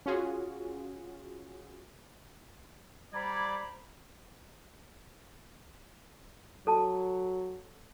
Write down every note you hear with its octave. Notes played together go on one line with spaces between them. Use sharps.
C#4 F4 F#4 G#4
G3 C5 D5 A#5 B5 G#6
F#3 A4 A5